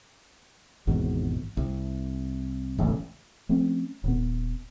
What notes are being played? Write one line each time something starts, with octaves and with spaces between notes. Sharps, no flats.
G#1 E2 G#2 B2
C2
E1 A1 C#3
F3 A3 C4 C#4
D#1 A#2 B3